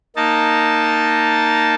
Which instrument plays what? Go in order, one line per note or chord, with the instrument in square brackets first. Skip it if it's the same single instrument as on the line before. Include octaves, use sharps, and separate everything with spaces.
[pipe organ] A#3 D#4 A5